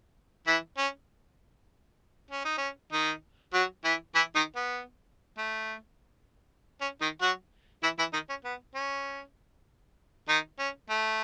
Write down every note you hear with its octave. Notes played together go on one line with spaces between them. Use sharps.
E3 E4
C#4
C#4
D#4
C#4
D#3 D#4
F#3 F#4
E3 E4
E3 E4
D#3 D#4
B3
A3
C#4
D#3 D#4
F#3 F#4
E3 E4
E3 E4
D#3 D#4
C#4
B3
C#4
D#3 D#4
C#4
A3